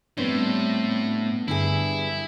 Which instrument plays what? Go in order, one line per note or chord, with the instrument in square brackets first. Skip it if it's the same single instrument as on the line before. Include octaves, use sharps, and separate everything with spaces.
[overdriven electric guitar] A2 [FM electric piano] G3 B3 D4 [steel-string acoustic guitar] C4 C5 C#5
[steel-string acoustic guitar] G2 G3 G#4 [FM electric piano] D3 [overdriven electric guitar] E4